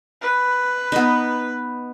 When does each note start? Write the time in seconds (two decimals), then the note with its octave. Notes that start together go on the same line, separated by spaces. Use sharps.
0.22 B4
0.92 B3 D#4